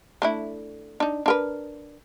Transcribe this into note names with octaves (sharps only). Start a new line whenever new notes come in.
A3 D4 E4
D4 D#4
D4 A#4 B4